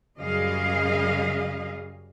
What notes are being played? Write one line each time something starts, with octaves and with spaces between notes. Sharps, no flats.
F#2 C#3 G3 G#4 D#5 F5